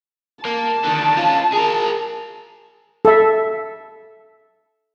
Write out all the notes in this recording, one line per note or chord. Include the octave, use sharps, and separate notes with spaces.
A#3 A5
D3 D#3
C#4 F4
G#4 A#4
A4 E5